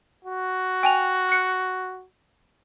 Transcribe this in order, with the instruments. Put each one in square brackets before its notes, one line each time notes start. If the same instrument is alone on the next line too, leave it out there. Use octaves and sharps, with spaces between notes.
[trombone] F#4
[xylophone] G5 G#5 F7
F#6 C#7